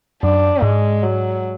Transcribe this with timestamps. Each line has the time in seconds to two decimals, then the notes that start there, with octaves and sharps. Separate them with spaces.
0.23 F#2 D4
0.62 G#2 G#3
1.03 F#3